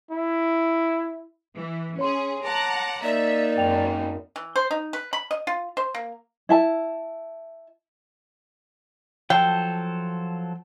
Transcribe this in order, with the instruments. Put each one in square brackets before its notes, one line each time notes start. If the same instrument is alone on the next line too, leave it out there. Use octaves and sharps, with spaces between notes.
[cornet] E4
[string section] E3
[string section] C#4 G#4 [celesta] C#5 C6
[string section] F#5 A#5 [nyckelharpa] A5 D6
[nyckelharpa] A#3 D#4 [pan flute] D5 [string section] E5
[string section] G#1 F#2 [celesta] G5 F7
[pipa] E3
C5
D#4
B4
B5
D#5
F4
C5
A#3
[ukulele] E4 E5 A5
[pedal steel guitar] F3 F#3 A4 [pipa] G5